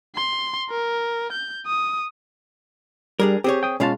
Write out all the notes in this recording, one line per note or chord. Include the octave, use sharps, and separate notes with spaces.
C6
A#4
G6
D#6
G3 D4 G#4 A#4
C4 G4 G#4 C#5
G5 D#6
B2 G#3 C#4 F4 F5 A5